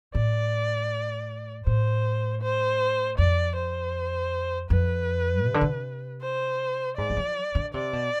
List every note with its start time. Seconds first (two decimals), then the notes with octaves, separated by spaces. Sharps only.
0.15 A2 D5
1.66 A2 C5
2.42 C5
3.18 F2 D5
3.56 C5
4.70 F2 B4
5.46 C3
5.54 D3
5.61 C3
6.22 C5
6.97 G#2 D5
7.10 G#3
7.17 F3
7.55 D3
7.74 C3 D5
7.93 B2